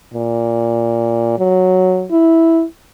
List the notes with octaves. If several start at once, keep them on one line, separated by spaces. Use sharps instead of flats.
A#2
F#3
E4